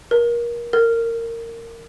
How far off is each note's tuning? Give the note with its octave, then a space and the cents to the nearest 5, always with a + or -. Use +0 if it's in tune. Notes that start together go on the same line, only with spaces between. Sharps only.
A#4 +25
A#4 -20